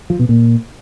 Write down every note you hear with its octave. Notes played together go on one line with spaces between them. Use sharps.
F3
B2
A#2